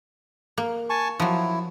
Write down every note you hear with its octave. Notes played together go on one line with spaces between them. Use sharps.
A#3
G#5 A5 C#6
F3 F#3 E4